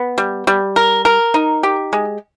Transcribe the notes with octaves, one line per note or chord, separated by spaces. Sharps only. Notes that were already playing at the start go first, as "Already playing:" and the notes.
Already playing: B3
G3
G3
A#4
A#4
D#4
G4
G#3